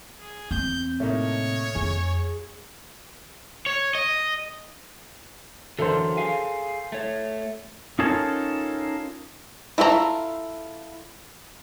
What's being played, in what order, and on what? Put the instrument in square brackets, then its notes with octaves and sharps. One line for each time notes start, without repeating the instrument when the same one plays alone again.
[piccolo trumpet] G#4
[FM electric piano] E2 [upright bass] C4 [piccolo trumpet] G6
[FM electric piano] A2 C3 [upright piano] A3 A#3 D#4 [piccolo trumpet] C#5
[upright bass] F2 F4 [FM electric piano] G#4
[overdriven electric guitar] C#5
D#5
[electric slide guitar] D3 E3 F#3 [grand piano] A4 A#4 C5
[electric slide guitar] G#4 F5 G#5
A3 C#5
C#4 D#4 F4 A4 A#4 C#5
[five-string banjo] E4 F4 A4 C5 A#5